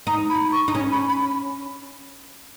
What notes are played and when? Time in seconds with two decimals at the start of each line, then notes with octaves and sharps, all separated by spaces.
0.07 D#4 A#5
0.29 B5
0.52 C#6
0.68 D#4
0.75 C#4 C#6
0.91 B5
1.09 B5